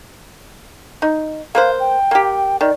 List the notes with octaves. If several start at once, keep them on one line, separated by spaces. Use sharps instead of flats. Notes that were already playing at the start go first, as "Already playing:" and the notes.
D#4
A#3 B4 C5 F5
G5
A#3 G4
D#3 D5